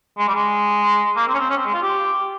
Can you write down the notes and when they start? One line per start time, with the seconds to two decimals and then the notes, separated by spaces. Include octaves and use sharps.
0.18 G#3
0.28 G3
0.34 G#3
1.16 A#3
1.28 C4
1.34 C#4
1.38 C4
1.49 C#4
1.57 C4
1.65 G#3
1.74 F4
1.82 G4